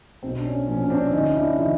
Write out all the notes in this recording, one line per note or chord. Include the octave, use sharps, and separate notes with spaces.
B1 C4
D4
C#4
A#2 F3 C#4
C#4
C4 D4
D2 C#4 D#4
D4 E4
C#3 E3 D#4 F4